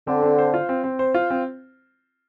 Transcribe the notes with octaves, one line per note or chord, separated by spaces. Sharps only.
D3 C4
C4
C5
F4
C4
C4
C5
F4
C4